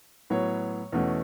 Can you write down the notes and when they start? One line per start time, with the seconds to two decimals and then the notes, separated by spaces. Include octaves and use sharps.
0.30 A2 F#3 B3 C#5
0.92 E2 B2 A3 C#4